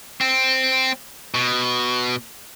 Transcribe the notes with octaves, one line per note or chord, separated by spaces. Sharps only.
C4
B2